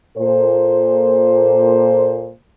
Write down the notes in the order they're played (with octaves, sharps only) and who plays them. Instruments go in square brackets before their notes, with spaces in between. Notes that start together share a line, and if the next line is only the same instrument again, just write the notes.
[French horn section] A#2 A4 C5